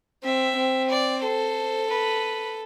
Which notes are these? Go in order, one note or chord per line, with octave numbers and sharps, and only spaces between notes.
C4 E5
C4
D5
A4 C5
B4